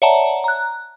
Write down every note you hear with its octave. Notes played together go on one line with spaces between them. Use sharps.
C#5 D5 E5 F#5 A5 A#5
A#5 F#6